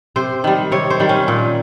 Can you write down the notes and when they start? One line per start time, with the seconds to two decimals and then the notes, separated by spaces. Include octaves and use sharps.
0.16 C3 C5
0.44 D#3 G3
0.72 C3 C#5
0.90 C5
1.00 D#3 G3
1.09 C#4
1.28 A#2